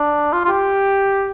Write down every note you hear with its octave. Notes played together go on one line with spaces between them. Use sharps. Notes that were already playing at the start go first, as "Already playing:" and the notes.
Already playing: D4
F4
F4
G4